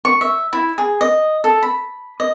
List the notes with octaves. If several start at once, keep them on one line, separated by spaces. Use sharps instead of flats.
C#6
E5
E4
G#4
D#5
A4
B5
D#5